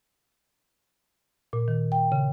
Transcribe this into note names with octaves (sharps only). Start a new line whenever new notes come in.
A#2
D#3
G5
C#3